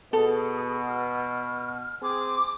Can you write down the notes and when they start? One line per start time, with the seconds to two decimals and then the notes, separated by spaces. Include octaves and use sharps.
0.13 B2 G#4 A4
0.88 F6
2.02 C4 G#4 D6